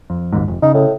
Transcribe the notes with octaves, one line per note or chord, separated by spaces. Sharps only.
F2
F#1 D#2 G#2
F1
C#3 D#4
A2